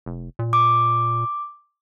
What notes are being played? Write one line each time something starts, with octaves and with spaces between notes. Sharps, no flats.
F1
A#2
D6